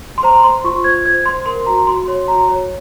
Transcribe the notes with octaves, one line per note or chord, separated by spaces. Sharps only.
C6
C5 A#5
C5 C6
F4 C#6
C5 G#6
C5 G#6
C5 C6
A#4 C6
F#4 A#5
F#4 C6
C#5 C6
F#4 A#5
C#5